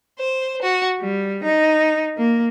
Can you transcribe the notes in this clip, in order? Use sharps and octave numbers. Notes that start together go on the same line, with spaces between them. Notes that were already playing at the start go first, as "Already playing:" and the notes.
C5
F#4
G3
D#4
A#3